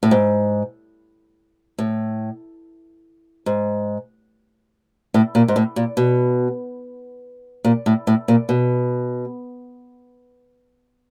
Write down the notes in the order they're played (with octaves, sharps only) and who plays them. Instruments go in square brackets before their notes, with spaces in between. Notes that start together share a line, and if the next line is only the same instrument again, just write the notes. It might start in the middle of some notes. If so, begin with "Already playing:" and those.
[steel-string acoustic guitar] A2
G#2
A2
G#2
A2
A#2
G#2
A2
A#2
B2
A#2
A2
A2
A#2
B2